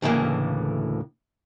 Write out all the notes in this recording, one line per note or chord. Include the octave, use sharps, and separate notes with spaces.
D2 A2 C#3 E3 A#3